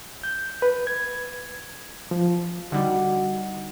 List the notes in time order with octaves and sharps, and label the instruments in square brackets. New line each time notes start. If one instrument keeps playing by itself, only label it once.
[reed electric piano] G6
B4
G#6
F3
[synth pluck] D3 G3 [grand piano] D#4 F#5 [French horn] F#4